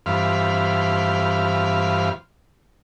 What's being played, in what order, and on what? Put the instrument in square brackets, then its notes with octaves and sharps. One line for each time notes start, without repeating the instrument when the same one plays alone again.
[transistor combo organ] G2 E3 C4 F4 F5 B5